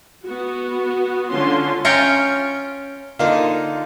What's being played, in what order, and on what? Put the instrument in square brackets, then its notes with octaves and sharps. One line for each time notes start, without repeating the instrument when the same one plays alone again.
[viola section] B3 F#4
D3 C#4 F4 C6
[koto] C#4 F4 C#5 G5 A#5
[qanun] D3 D#4 [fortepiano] A#3 F4